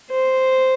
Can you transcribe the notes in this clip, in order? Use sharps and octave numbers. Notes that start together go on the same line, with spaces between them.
C5